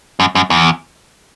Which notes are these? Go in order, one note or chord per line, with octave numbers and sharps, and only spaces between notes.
F#2
F#2
E2